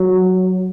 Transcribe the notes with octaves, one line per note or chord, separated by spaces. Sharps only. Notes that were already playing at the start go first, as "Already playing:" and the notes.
Already playing: F#3